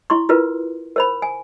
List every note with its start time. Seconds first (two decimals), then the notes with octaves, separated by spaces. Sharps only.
0.10 E4 C6 C#6
0.29 E4 F4 A#4 B4
0.96 A#4 C5 B5
1.22 G#5